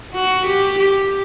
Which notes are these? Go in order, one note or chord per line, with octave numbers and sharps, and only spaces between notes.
F#4
G4
G4